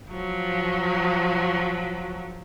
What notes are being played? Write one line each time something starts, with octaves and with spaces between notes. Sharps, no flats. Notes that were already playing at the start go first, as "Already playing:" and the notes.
F3 F#3